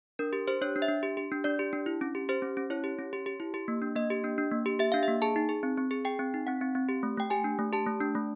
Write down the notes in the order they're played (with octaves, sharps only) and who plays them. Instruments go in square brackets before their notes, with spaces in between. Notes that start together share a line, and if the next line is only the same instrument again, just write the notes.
[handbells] D4 A#4
G4
G4 C5
D4 C#5
D4
E5
D4
G4
G4
D4
D4 D5
G4
D4
E4
C#4
G4
G4 C5
C#4
C#4
E4 C#5
G4
C#4
G4
G4
E4
G4
A#3
D4
A#3 D#5
G4
D4
D4
A#3
G4
G4 E5
D4 F5
A#3 E5
G#4 A5
D#4
G#4
C4
C4
G#4
G#4 G5
C4
D#4
C4 F#5
C4
C4
G4
A3
A3 G5
G4 G#5
D4
A3
G4 A5
A3
D4
A3